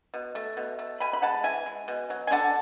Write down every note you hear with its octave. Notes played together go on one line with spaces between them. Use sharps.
B2
A3
B2
A3
B2 G#5 B5
B5
G#3 F#5 A5
E3 E5 G#5
G#3
B2
F#3
G#5
D3 F#5 A5